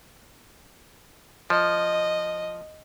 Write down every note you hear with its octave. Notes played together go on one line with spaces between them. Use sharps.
F3 D#5